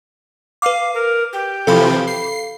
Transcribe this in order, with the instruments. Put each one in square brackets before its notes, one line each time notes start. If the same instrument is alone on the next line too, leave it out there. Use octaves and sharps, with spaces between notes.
[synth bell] B4 D6 [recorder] F5
[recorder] A#4
G4
[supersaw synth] C3 E3 F3 [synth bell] A4 F5 B5
[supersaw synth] C7